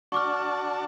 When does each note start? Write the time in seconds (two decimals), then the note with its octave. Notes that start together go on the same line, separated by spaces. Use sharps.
0.12 D4 F#4 A5 C#6 D6 F6